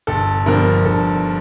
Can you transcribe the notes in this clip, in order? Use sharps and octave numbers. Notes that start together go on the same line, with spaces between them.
G1 A4
G2 D3 F3 A#4
G1 A4